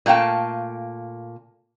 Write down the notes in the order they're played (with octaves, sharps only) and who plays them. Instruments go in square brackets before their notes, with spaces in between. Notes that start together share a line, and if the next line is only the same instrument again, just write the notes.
[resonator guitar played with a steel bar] A#2 A3 F5 G5 A5